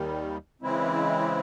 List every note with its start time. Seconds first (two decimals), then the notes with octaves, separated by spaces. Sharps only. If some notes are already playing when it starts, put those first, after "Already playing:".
Already playing: D#2 D#3 G3
0.62 C#3 E3 G#3 C4 E4